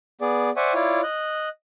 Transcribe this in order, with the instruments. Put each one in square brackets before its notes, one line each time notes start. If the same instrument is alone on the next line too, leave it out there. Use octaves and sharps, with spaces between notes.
[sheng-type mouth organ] B3 G#4 D5
C5 D5 E5 F#5 G#5 C#6
E4 F4 C#5 D5
D#5 F#6